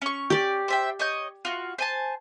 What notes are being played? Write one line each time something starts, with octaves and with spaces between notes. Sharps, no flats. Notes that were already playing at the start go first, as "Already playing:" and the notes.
C#4 C#6
G4 D5
C5 E5 G5
C#5 D#5 G6
F4 F#4
C5 G#5 A5